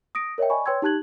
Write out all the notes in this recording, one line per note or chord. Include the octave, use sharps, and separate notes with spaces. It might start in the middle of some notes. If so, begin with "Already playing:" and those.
D#6 A#6 D7
A#4 C#5 D#5 E5 G5
D5 D#5 G#5 B5 C#6
B4 C#5 G5 C6 E6 G#6
D#4 G4 A5 F#6 G#6 F#7